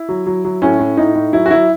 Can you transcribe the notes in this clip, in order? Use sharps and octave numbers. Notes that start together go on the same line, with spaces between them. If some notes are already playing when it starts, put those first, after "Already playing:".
Already playing: E4
F#3
F#3
F#3
A2 C#4
A2
A2 D#4
A2
F#3 E4
F#4
F#3 E4